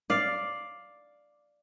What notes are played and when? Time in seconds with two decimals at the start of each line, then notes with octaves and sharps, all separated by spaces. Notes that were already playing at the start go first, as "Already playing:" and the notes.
0.10 D5 F5